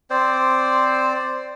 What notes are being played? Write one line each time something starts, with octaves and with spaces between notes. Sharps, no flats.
C4 C5 D5